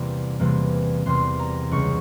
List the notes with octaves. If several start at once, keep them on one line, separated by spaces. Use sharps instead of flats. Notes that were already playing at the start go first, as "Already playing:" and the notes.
Already playing: E2 C3 E3 G3 A#3 A#5
E2 C3 E3 G3 A#3
E2 C3 E3 G3 A#3 C6
A#5
C#2 C#3 G3 C#6